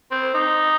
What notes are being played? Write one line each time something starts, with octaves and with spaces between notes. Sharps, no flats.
C4
D#4